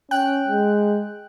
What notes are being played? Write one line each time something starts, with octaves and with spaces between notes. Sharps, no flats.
C#4 G5 F#6
G#3